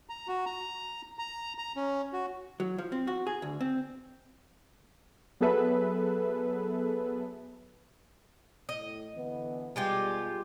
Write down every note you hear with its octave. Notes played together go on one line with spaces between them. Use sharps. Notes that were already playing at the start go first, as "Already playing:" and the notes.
A#5
F#4
A#5
A#5
A#5
C#4
F#4
F#3
F3
C4
F#4
G#4
D2
C4
F#3 B3 G#4 A4 B4 E5
A2 D#5
D3 E3 B3
B2 G3 G#3 F4 G4